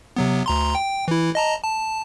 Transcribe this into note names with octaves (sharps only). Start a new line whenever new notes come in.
C3 F#3 B3
D2 A#5 C6
G5
E3 E4
D#5 A5 A#5
A5